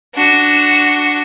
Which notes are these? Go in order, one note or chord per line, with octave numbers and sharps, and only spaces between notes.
D4 F#4